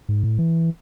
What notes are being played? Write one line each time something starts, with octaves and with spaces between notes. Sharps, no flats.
G#2
A2
E3